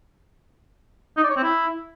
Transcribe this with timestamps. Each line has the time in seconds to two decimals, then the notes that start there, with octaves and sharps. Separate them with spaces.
1.17 D#4
1.23 D5
1.30 C#5
1.37 C4
1.43 E4